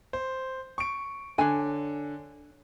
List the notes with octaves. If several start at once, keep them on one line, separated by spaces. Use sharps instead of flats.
C5
C#6 D7
D3 D4 C#5 G#5